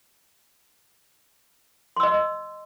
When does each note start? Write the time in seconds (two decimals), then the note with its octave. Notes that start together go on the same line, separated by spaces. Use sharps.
1.96 C6
2.00 E6
2.03 D#5